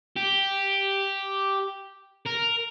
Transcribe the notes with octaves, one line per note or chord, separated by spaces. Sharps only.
G4
A#4